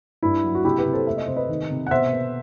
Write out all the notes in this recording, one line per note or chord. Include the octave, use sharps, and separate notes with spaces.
G2 E4
F#3
F#4
C3 E4 G4
G4 B4
C3
A4 C5
A3 E5
D#5
C3 C5
B4 D#5
D#3
C3
F#5
B2 C5 E5
B3